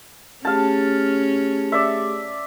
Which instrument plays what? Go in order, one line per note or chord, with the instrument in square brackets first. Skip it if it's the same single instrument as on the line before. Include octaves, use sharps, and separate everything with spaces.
[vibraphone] A3 G4 G#4 [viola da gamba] C#4 [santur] F5 A5
[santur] D5 E5